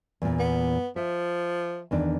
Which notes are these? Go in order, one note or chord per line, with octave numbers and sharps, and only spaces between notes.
E2 A#2
B3
F3 E5
E2 D#3 D4